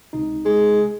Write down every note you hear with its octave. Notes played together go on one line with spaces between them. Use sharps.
C#2 C3 D#4
G#3